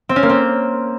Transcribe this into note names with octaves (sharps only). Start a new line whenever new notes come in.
C4
C#4
A#3
C4